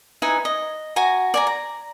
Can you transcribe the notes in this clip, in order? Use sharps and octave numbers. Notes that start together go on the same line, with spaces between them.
D#4 E4 B4 G#5
D#5
F#4 G#5 A#5
D5 G#5 A#5
A#5